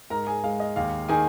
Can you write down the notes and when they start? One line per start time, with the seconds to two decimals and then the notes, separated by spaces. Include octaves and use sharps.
0.10 G#2 A#4 A#5
0.27 G#4 G#5
0.43 G#3 F5
0.60 D#5
0.76 D#2 F5
1.09 D#3 G#4 G#5